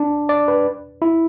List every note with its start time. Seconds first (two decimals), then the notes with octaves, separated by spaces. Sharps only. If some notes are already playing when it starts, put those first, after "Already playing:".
Already playing: D4
0.29 D5
0.48 B4
1.02 E4